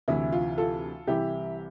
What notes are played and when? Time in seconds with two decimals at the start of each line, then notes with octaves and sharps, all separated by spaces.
0.08 D2 C3 E3 E4
0.32 F4
0.58 F4 A4
1.07 C2 C3 E3 E4 G4